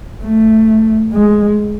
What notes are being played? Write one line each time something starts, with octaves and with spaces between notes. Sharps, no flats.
A3
G#3